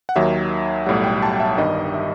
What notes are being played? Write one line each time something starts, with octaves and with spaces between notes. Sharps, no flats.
F#5
D#2 D#3 F#3 E5
B1 A2 G3 F#5
G5
A5
E5
G1 G2 D#3 G3 D#5
E5